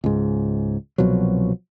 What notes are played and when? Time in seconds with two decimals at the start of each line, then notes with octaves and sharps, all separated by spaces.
0.04 C#2 G#2
0.98 C2 B2 F3 F#3